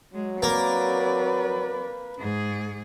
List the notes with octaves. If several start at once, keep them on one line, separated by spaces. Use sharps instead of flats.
F#3 G#3
A#3 C4 B4 D5
G#2 G#4